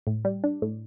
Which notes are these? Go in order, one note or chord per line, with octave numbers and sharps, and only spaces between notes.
A2
G3
D4
A2